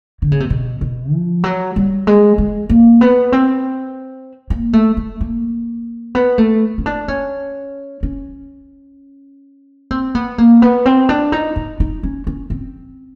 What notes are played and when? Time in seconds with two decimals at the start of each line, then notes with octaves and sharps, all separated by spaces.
0.22 D3
0.32 C#3
0.40 C3
0.50 B2
0.81 B2
1.13 F3
1.44 F#3
1.76 G3
2.07 G#3
2.38 G#3
2.69 A#3
3.01 B3
3.32 C4
4.50 A#3
4.73 A3
4.97 A3
5.21 A#3
6.15 B3
6.38 A3
6.78 C#4
6.86 D4
7.08 C#4
8.03 C#4
9.91 C4
10.15 B3
10.38 A#3
10.62 B3
10.85 C4
11.09 D4
11.32 D#4
11.56 D#4
11.80 D#4
12.03 C#4
12.27 C#4
12.50 C4